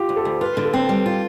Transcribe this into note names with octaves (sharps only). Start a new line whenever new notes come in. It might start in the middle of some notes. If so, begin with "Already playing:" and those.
Already playing: F4 G4
D2
A4
D2
F4 B4
D3
A4
C4
G3 B4
F4